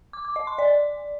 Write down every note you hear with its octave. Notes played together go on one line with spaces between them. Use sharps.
D6
D6
D#5
C6
D5